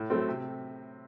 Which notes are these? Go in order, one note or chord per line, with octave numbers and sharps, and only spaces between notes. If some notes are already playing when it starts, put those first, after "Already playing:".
Already playing: A2
F#3 A3 C4
C3